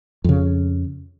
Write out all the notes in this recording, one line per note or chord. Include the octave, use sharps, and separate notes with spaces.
F2 C#3